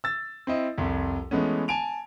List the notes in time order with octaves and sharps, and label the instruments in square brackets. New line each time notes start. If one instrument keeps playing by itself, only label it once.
[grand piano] E6 A6
C4 E4 D#5
C2 F2
E3 G#3 A3 B3 C#4
G#5 A5 D7 F7